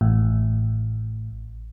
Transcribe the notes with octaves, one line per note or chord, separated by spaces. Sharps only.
A1 A2